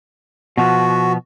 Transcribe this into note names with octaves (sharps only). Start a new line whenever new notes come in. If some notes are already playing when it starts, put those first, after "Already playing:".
B2 F3 B3 F#4